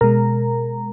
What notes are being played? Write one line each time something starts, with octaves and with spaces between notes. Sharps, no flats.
B2 G#3 A#4 A#5